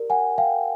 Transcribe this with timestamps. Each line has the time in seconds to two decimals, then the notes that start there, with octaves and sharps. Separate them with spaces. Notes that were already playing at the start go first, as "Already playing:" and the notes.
Already playing: G4 A#4 D5
0.10 F#5 G#5
0.38 F5 G5